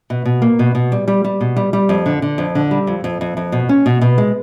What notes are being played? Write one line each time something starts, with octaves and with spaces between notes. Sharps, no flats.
B2
B2
A#3
B2
B2
G3
G3
G3
B2
G3
G3
F2
D3
D3
F2
D3
G3
F2
F2
F2
F2
B2
C#4
B2
B2
G#3